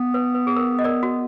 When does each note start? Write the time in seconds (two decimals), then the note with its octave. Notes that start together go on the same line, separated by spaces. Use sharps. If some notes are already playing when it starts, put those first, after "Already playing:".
Already playing: B3
0.14 B4
0.34 B4
0.47 G#4
0.56 A#4
0.79 D#5
0.84 A#4 D5
1.03 F#4